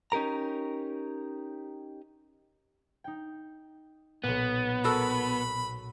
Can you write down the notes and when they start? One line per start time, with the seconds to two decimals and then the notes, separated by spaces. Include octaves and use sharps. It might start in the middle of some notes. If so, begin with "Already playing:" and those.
0.12 C#4 D#4 G4 A#4 A#5
3.04 D#4 G5
4.24 B1 A#2 B3
4.84 F#4 A4 A#4 B5 D#7